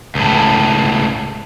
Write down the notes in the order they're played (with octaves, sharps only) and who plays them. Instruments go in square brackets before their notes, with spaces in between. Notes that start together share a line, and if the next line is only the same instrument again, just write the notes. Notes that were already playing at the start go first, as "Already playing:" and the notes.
[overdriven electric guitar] C#2 A2